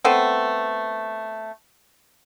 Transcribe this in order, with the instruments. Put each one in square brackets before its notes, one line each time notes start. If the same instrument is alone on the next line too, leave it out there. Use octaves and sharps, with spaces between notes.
[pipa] A3 B3 C4